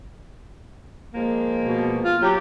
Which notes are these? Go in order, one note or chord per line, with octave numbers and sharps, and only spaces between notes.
F3 G#3 A#3
B2
F4
F#3 G4